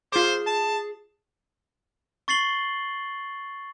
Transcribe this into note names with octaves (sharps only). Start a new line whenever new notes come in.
F4 G#4 C5 D6
A5
C#6 A6 C7 F#7 G7